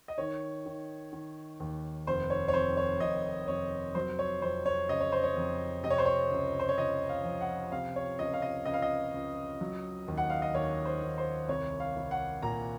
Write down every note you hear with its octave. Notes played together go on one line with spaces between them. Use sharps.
D#5
D#3 C#5
D#3
D#3
D#2
F1 C5
C#5
C#5
F2 C5
C#5
F1 D#5
F1 C#5
F#3 C5
C#5
F2 C5
C#5
C#3 D#5
C#5
C5
C#5
F2
C3 D#5
C#5
C5
C#5
C#2
C5
C#5
C#2 D#5
F5
F3
F#5
C3 F5
C#5
C#2 D#5
F5
D#5
C#2 D#5
F5
D#5
C#2
F#3
D#2
F#5
F5
D#5
D#2 C#5
C5
D#2
C5
C2 C#5
F5
C2
F#5
A#2 A#5